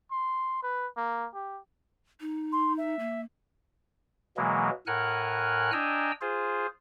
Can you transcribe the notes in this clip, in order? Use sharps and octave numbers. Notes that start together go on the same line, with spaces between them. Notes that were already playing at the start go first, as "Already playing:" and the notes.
C6
B4
A#3
G4
D#4
C6
E5
A#3
B2 E3 F#3 G#3 A#3
A2 A#4 F#5 G#5 F6 F#6
D4 D#5 G5 G#5 A#5 E6
F4 G#4 C5